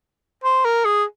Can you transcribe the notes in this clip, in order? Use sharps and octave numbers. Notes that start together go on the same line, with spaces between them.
C5
A#4
G#4